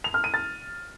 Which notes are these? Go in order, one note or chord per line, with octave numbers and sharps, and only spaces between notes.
F7
F6
D#7
A6